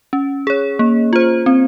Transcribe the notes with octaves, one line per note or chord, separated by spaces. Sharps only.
C#4
G#4 C#5
A#3
F4 C5
C4